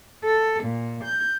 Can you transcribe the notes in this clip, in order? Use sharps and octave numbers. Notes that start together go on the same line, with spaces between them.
A4
A#2
G6